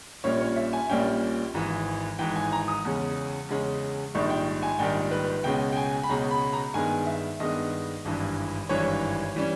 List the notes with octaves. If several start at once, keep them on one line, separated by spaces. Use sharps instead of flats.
A#1 A#2 G3 A#3 C#4 C#5
C#5
E5
G#5
A#1 A#2 G3 A#3 C#4 G5
G#1 G#2 E3
G#1 G#2 E3 G5
G#5
A#5
D#6
E2 C#3 G#3 C#4
E2 C#3 G#3 C#4
A#1 G#2 D#3 G3 C#6
G5
G#5
A#1 G#2 D#3 G3 G5
B4
C#2 B2 G#3 C#4 G5
G5
G#5
B5
C#2 B2 G#3 C#4 A#5
B5
A#5
G2 D#3 G#3 B3 G#5
E5
G2 D#3 G#3 B3 D#5
G#1 G2 E3 G3
G#1 G2 E3 G3 C#5
E3 G3 C#4